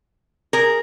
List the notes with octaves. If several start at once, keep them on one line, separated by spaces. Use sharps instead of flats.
G#4 A#4